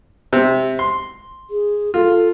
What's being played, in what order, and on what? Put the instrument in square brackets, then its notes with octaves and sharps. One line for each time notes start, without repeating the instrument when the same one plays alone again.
[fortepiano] C3
C6
[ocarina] G#4
[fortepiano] F4 [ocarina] A4